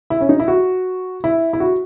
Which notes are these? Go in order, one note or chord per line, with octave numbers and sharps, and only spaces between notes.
E4
C#4
D#4
E4
F#4
E4
E4
F#4